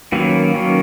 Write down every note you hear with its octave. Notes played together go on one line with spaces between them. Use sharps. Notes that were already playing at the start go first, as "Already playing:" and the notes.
D#3 F#3 A#3 C#4 B4
D#3 F#3 A#3 C#4